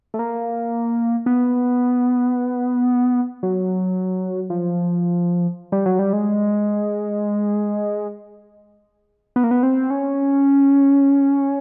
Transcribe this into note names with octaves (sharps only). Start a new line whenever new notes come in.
A3
A#3
B3
F#3
F3
G3
F#3
G3
G#3
B3
A#3
B3
C4
C#4